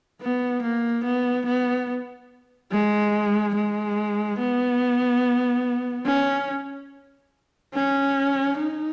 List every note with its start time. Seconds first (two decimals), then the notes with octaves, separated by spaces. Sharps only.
0.21 B3
0.63 A#3
1.04 B3
1.46 B3
2.71 G#3
3.55 G#3
4.39 B3
6.06 C#4
7.74 C#4
8.58 D#4